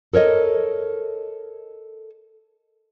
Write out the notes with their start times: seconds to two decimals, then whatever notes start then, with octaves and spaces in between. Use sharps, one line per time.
0.13 A4 A#4 C#5 D#5